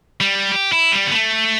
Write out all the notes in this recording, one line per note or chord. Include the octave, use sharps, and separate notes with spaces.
G3
G4
E4
G3
B3
A3